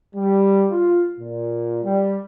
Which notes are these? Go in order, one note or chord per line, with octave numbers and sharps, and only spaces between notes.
G3
F4
A#2
G3